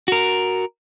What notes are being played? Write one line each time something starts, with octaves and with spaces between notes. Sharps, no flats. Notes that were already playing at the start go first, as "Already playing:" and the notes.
F#4 A#4